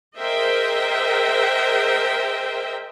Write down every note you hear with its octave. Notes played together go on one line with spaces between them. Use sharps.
G#4 A#4 C5 D#5 E5 G5